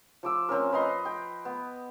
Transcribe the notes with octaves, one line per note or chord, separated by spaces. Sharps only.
F3 D6 E6
A#3 C4 C#4 A#4
B4 D#5 A#5 C6
G5
B3